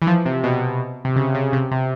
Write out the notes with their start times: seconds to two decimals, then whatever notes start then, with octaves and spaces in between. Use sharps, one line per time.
0.02 E3
0.07 F3
0.26 C3
0.44 B2
1.05 C3
1.16 C#3
1.35 C#3
1.53 C3
1.71 C3